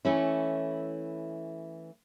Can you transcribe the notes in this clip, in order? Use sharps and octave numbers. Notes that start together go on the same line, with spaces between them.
E3 A3 C#4 E4